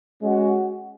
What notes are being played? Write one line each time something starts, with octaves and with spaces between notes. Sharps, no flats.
G#3 C#4 F#4